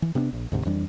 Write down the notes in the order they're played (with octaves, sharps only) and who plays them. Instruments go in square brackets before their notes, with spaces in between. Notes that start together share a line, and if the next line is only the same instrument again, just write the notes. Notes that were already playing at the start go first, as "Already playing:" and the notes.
[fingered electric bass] E3
C3 B3 C#4 D4
A#1
D2 G#2 C3
F2 E3 G3 D4